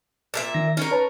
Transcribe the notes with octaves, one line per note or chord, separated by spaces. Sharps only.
A#2 A4 E5
D#3 A#6
C#4 D#4 A#4
B4 C#5 A5